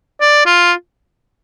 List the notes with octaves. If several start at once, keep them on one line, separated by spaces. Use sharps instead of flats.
D5
F4